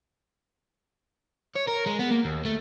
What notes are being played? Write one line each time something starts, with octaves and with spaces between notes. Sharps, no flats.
C#5
A#4
G#3
B3
A#3
D#2
A3